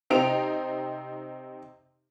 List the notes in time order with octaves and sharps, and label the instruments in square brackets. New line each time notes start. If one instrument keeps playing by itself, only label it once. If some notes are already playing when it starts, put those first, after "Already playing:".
[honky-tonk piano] C3 C4 D#4 D7 F7